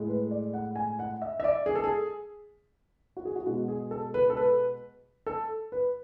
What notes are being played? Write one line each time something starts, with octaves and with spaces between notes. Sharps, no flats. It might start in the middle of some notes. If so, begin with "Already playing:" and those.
Already playing: A2 G#3
B4
D5
F#5
G#5
F#5
E5
E5
D5
G#4
A4
G#4
F#4
G#4
F#4
B2 G#3 F#4
G#4
A4
B4
A4
B4
A4
B4